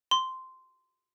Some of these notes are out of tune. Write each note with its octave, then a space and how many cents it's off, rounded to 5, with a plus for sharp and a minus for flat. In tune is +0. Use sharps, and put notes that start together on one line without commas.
C6 -10